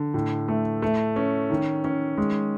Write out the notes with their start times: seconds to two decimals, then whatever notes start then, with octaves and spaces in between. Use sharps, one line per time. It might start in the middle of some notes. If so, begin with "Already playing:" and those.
Already playing: D3
0.14 A2
0.48 A3
0.82 A3
1.16 C#4
1.50 D#3
1.84 C#4
2.17 G#3